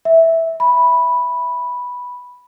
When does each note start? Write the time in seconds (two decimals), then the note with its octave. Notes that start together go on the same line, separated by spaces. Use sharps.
0.05 E5
0.60 B5